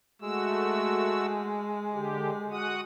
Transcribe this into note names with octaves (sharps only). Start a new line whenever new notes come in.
G#3 A3 F#4 E6
D3 G4
F#4 F#5 D#6